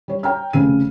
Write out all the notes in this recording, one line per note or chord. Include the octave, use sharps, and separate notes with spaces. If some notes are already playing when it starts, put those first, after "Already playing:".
G3 C#5
C#5 G5 A#5 F6
F1 C#3 D#7